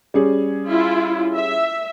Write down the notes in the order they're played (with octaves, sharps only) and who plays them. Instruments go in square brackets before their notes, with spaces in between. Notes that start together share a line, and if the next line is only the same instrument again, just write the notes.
[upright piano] G3 C#4 G#4
[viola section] E4 F4
E5